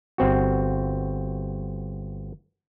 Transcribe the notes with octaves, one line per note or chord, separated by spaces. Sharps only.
G1 C4 F#4